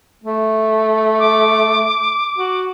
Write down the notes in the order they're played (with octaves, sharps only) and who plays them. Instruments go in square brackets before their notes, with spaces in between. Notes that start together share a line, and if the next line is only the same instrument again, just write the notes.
[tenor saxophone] A3
[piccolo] D6
[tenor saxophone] F#4